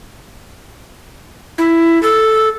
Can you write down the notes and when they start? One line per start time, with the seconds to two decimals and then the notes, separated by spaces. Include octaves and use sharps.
1.58 E4
2.03 A4